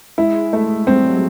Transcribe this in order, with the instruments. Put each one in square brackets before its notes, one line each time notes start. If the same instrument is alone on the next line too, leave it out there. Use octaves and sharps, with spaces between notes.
[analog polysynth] G#3 [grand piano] E4
[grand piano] A3
[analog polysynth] G3 [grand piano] C4
[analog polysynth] F#3